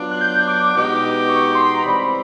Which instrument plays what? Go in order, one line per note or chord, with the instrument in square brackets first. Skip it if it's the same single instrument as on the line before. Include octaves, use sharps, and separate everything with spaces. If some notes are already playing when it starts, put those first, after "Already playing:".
Already playing: [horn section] F#3 B3 D4 F4
[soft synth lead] F#6
G6
D6
[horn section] B2 G#3 B3 D#4 G4
[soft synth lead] C#6
C6
A#5
[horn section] C3 E3 G3 C4 [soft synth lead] B5